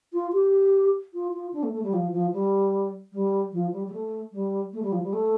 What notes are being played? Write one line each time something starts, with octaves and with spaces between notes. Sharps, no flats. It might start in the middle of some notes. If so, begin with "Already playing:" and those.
F4
G4
F4
F4
D4
A3
A3
G3
F3
F3
G3
G3
F3
G3
G3
A3
G3
A3
G3
F3
G3
A3